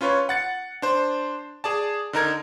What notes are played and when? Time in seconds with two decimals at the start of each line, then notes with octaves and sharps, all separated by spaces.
0.01 C#4 F4 B4 C#5
0.29 F#5 A6 C#7
0.82 D4 C5
1.64 G#4 D5 A5
2.13 D3 D#4 A#4 G#6